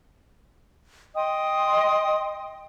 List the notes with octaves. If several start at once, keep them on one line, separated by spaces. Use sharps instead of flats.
D#5 G5 C6 D#6